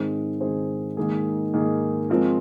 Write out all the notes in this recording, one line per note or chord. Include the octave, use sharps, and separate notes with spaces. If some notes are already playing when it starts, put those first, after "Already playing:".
Already playing: G#2 D#3 C4 G#4 C5
G#2 D#3 C4 G#4 C5
G#2 D#3 A#3 G#4
G#2 D#3 A#3 G#4
F3 G#3 C4 F4 A#4